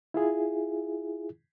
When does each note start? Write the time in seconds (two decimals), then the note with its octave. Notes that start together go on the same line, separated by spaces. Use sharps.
0.14 E4 F4 G#4